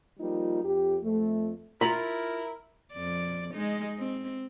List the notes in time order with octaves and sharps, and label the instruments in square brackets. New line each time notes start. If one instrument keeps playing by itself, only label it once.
[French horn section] F3 G3 A#3 D#4 F4
F2 G4
F2 A3
[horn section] E4 A#4 [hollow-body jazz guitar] F4 A#5 B5
[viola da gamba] F2 D5
G#3 D#4
C4